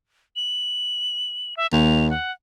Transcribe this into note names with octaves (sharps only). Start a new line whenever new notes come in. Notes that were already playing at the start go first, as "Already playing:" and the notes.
F#7
E5
D#2 F7
F#5